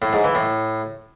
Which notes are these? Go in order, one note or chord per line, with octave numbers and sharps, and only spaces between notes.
A2
G#2
E3
A2